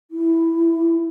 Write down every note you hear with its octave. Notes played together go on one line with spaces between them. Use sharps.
E4